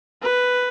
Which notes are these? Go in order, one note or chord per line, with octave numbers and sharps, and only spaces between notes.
B4